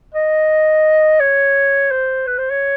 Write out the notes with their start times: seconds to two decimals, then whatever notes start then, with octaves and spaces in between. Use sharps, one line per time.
0.15 D#5
1.20 C#5
1.91 C5
2.27 B4
2.38 C5
2.51 C#5